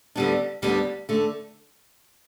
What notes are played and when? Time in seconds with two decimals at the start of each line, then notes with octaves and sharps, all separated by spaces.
0.16 D2 D3 G3 B3 D4
0.62 D2 D3 G3 B3 D4
1.09 D3 A3